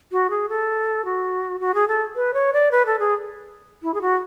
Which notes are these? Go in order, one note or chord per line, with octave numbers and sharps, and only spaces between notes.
F#4
G#4
A4
F#4
F#4
G#4
A4
B4
C#5
D5
B4
A4
G#4
E4
G#4
F#4